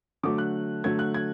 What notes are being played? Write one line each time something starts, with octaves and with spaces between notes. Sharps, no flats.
D3 F#3 A3 D6
F#6
D3 F#3 A3 G#6
F#6
G#6